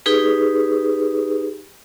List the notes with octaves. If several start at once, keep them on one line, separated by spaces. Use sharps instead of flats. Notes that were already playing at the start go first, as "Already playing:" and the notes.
D#4 G4 G#4 B4